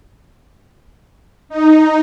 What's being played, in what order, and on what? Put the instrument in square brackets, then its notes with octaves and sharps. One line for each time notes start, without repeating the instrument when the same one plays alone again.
[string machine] D#4